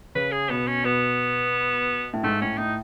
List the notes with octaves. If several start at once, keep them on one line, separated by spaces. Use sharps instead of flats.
C#3 B4
G#4
B2 B3
C#4
B2 B3
A2
G#2 A3
A2 C#4
A2 D#4